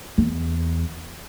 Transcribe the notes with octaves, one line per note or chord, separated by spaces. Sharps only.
E2